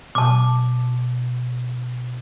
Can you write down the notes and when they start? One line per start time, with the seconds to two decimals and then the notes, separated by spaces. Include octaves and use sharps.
0.15 B2 A5 D6